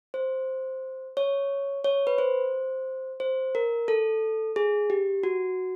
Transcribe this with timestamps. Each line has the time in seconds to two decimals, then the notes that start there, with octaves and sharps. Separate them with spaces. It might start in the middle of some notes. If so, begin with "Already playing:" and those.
0.14 C5
1.17 C#5
1.84 C#5
2.07 B4
2.18 C5
3.20 C5
3.55 A#4
3.88 A4
4.56 G#4
4.90 G4
5.23 F#4